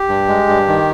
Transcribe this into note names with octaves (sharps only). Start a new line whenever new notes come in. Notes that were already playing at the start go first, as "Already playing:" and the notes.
Already playing: G4
G2
G#3
G2
D#3